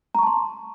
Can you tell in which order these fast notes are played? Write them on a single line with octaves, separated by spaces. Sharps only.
A#5 C#6 A5 C6